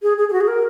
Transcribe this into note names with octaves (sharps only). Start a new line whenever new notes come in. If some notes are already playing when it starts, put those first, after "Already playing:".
G#4
G#4
G#4
F#4
G#4
A#4